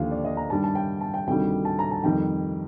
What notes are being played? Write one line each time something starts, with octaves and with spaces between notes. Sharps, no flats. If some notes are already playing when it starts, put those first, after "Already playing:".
Already playing: D#2 D3 F3 F5
D5
D#5
A#5
G2 D#3 G3 A5
A5
G5
A5
G5
D2 C3 D#3 G3 G5
A5
A#5
A5
F2 C3 D#3 G3 G5